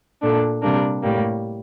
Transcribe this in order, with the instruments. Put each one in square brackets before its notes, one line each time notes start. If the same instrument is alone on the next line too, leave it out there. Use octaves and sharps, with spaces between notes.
[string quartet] A#2 A3 D4
C3 G3 A#3 D4
A2 G3 A#3